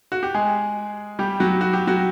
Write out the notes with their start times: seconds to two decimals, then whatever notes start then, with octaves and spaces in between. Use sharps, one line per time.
0.12 F#4
0.23 G4
0.34 G#3 G#4
1.19 G3 G4
1.40 F#3 F#4
1.61 F#4
1.73 G4
1.87 F#3 F#4